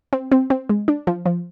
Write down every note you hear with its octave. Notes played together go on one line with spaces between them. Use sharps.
C4
C4
C4
G#3
D4
F3
F3